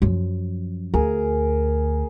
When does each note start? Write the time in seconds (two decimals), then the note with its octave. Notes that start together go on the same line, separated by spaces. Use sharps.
0.02 F#2 F3
0.94 D2 G#4 A#4